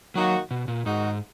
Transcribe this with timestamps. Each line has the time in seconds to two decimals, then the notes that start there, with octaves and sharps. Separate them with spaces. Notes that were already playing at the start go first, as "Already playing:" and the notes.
0.15 D#3 F#3 A#3 D#4 F#4
0.51 B2
0.68 A#2
0.86 G#2 D#3 G#3 D#4 F#4